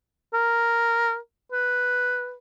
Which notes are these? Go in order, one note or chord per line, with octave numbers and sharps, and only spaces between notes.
A#4
B4